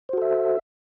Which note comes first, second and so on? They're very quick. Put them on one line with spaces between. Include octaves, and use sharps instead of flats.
C5 F#4 A4 E5